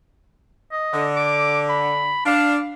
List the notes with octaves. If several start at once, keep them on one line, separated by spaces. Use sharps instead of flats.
D#5
D3
D6
B5
D4 F5